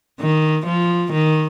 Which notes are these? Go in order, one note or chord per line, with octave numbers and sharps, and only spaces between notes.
D#3
F3
D#3